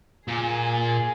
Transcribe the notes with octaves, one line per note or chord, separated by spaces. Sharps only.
A#2 G#4